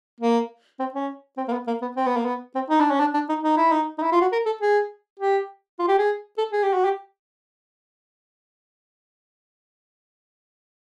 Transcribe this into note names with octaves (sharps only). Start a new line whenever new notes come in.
A#3
C4
C#4
C4
A#3
B3
A#3
B3
C4
B3
A#3
B3
C4
D#4
D4
C#4
D4
D4
D#4
D#4
E4
D#4
D#4
E4
F4
F#4
A#4
A4
G#4
G4
F4
G4
G#4
A4
G#4
G4
F#4
G4